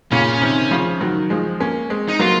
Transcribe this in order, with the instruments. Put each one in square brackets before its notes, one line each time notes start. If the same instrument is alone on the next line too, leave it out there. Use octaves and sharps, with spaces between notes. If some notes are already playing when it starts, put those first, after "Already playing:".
[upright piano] A#2 C#3 [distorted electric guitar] C#4
[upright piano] C3 D#3
C#3 F3
D#3 F#3
F3 G#3
A#3 C#4
G#3 C4
[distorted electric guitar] D#4
[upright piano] F#3 A#3 [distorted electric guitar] F4